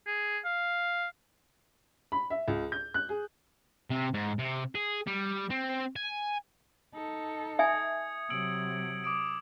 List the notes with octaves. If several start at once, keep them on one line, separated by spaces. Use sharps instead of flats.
G#4
F5
B5
E5
C#2
G6
F#6
G#4
C3
G#2
C3
G#4
G3
C4
G#5
D#4 A4
E5 G#5 D#6 G#6 C#7
C3 F#3 E6 D7 F#7
D6 D#6 D7